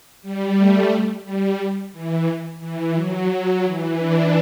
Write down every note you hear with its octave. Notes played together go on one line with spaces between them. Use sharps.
G3
A3
G3
E3
E3
F#3
F#3
E3
D4